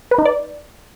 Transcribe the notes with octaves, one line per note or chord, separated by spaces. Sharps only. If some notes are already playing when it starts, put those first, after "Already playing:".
B4
D#4
D5